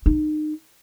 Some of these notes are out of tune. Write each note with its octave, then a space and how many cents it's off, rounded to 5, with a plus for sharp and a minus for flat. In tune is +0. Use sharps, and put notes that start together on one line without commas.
D#4 -30